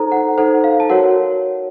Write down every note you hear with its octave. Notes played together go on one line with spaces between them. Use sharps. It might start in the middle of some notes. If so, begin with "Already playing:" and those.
Already playing: D#4 A4 C5 A#5
F#5
D#4 A4 C5 F#5
F5
A5
F#4 A#4 C#5 F#5